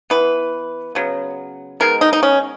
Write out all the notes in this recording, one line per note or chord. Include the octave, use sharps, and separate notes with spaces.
E3 B3 B4
C#3 F#3 B3
D#3 G#3 B3 A#4
D#4
D#4
C#4